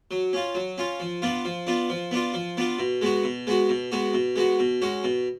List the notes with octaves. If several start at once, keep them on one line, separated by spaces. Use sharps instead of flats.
F#3
C#4 F4
F#3
C#4 F4
F3
B3 D4 F4
F3
B3 D4 F4
F3
B3 D4 F4
F3
B3 D4 F4
B2
G#3 B3 F#4
B2
G#3 B3 F#4
B2
G#3 B3 F#4
B2
G#3 B3 F#4
B2
G#3 C#4 F#4
B2